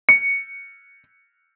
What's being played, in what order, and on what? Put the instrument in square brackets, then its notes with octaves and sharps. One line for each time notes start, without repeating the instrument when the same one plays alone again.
[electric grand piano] C#7